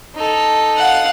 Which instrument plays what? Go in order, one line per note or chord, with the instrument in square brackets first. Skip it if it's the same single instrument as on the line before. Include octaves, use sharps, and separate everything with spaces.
[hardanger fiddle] D#4 A4
[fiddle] F5 F#5